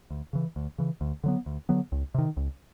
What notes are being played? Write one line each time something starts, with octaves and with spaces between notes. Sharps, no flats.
D2
C#3 E3
D2
C#3 E3
D2
D3 F#3 B3
D2
D3 F#3 B3
C#2
C3 D#3
C#2